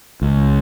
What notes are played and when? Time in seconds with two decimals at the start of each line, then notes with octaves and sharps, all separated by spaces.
0.22 C#2